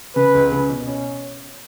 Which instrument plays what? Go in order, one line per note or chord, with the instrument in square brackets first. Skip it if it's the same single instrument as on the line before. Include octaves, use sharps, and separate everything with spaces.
[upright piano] C#3 [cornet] B4
[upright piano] C#2
C#3
B2
C#4